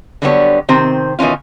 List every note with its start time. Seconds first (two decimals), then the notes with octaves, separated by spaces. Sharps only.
0.22 D3 F#3 G3 B3 F4 C#5
0.69 C3 D#3 C4 C5
1.19 B2 D#3 E3 C#4 F4